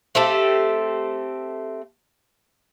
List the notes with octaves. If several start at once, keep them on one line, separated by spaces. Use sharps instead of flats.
A3 C4 G4 A4